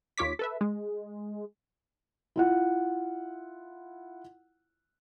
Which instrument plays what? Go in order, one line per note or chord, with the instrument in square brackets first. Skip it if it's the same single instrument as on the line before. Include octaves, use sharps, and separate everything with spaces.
[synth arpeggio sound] D#2 F4 C#5 D6 B6
A4 B4 E5
G#3
[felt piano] E4 F4 F#5